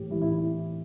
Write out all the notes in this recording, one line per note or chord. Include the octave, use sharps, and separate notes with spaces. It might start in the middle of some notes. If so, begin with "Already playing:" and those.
Already playing: A2 E3 G4
A2 E3 E4
E4
E4